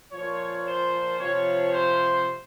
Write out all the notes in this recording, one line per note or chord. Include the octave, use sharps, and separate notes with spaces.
A#2 F3 C#5
C5
C3 F3 C#5
C5